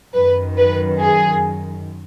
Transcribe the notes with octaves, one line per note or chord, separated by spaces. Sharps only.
F#2 D#3 B4
B4
G#4